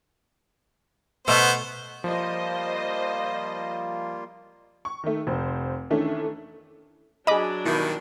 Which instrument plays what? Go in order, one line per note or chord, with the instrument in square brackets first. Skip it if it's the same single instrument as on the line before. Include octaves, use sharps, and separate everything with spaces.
[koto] B2 A3 [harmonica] B3 C5
[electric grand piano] F3 [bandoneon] G3 A#3 F4 [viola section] C5 D#5
[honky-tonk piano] C#6
D#3 A3
F1 C5
D#3 E3 A3 C#4 D4
[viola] F#3 D4 [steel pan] G#4 B5 [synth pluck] D#5 D6
[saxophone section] G2 B2 D#3 [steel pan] E4